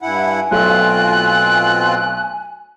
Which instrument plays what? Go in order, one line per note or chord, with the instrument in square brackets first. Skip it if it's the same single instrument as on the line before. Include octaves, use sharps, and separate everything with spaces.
[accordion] G2 E4 F#5 [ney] G#5
[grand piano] B1 A3 [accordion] B2 C4 F4 [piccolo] F#6